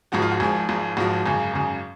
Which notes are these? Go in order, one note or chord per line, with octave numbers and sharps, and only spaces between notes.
G#1 G#2 F3 F#4
F4
F#4
G#1 G#2 F3 G#4
G#1 G#2 F3
G#1 G#2 F3 F#4
G#1 F#2 C#3 G#4
G#1 F#2 C#3 G#4